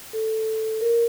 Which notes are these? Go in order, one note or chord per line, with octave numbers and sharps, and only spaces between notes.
A4
A#4